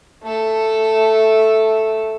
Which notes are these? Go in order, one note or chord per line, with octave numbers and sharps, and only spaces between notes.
A3 A4